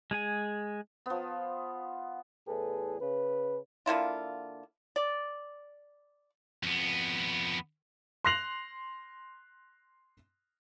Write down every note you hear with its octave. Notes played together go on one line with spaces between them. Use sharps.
G#3 G#4 G#5
F3 B3
E2 A2 G#4 A4 B4
C#3 B4
D3 A#3 E4 F4
D5
F2 B3
C6 F#6 A#6 C7 F7 F#7